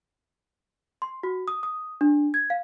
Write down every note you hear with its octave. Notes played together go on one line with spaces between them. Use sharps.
C6
F#4
D#6
D#6
D4
G#6
F5